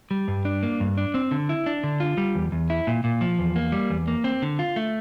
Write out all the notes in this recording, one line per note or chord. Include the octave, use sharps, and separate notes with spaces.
G3
G2
D4
A#3
G2
D4
C4
D3
E4
D4
D3
F4
G3
E2
E2
E4
A#2
A#2
F3
E2
A#3
G3
E2
A#3
C4
D3
F4
A3